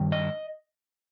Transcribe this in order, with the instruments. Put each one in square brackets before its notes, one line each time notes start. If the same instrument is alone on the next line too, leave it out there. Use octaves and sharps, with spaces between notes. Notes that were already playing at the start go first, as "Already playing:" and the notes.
Already playing: [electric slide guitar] G2 D#3
D#5